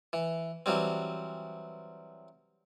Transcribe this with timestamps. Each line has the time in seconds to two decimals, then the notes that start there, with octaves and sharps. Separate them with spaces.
0.13 E3
0.66 E3 F#3 G3 C4